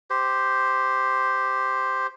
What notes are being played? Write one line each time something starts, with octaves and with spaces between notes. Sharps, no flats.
G4 C5